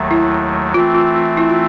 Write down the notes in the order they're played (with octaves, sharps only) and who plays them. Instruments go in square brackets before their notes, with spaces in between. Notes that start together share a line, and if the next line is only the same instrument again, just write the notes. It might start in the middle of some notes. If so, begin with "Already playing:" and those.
Already playing: [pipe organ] D#2 D#3 F#3 A3
[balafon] E4
[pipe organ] E3 A3 C4 [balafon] F4
[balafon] F4
F4
E4
F4